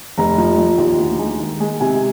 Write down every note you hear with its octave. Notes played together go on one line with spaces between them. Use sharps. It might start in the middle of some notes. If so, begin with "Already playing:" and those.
F1 A#5
F3
F3
D#2
D2
G#3
D#3
G#3
C3 G#5